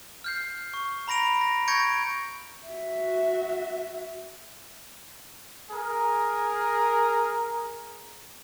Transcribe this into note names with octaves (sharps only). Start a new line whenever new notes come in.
F6 G6 C7
C#6
A#5 B5 A#6 D7 F7
A#6
C#6 G6 G#6 A#6 C#7 D7
F#4 E5
G#4 A#4